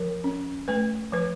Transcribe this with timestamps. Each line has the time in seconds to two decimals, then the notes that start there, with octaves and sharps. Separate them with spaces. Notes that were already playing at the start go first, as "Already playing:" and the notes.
Already playing: F3 A#4
0.24 C#4
0.68 A3 B4
1.12 F3 B4